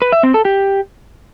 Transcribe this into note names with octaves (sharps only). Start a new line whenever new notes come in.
B4
E5
C4
A4
G4